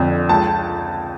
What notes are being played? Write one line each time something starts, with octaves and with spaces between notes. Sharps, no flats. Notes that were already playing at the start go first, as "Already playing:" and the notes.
Already playing: F2 D3
C#2 A5